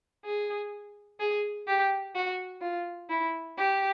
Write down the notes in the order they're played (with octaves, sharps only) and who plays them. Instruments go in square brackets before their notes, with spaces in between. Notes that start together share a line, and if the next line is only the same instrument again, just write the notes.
[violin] G#4
G#4
G4
F#4
F4
E4
G4